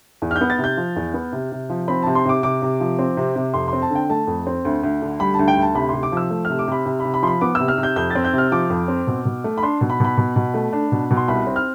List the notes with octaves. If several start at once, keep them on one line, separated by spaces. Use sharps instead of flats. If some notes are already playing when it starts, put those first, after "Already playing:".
E2
F6
G6
B3
A6
C3
G6
F3
E2
B3
C3
C3
F3
C4 B5
C3 A5
C6
C3 D6
C3 D6
C3
F3
C4
C3
C3
F2 C6
C4 C6
A5
D3
G5
A3 A5
F2
C4
D2
D2
D3
G3 B5
A5
D2
G5
D2
A5
C3 B5
C3 C6
D6
F3 E6
A3
C3 F6
D6
C3 B5
C3
B5
C3
B5
F3 B5 C6
B3 D6
C3 E6
F6
C3
G6
F2 G6
C4 A6
G6
C3
F6
F3 D6
F2
C4
B2
B2
A3
B5
D4 C6
B2
B5
B2 B5
B2
B2
A3
D4
B2
B2
C6
C2 B5
C4
F6